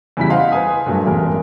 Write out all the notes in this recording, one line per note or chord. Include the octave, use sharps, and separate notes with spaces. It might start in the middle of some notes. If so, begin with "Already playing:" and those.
E2 C#3 G3 E4 B6
C5 D#5 F5 F#5 C6
B4 C5 G#5 D#6
G2 A#2 F#3 A3
A1 E2 G#3 A#4